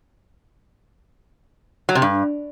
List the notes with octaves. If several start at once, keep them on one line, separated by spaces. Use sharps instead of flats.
F#3
C3
G2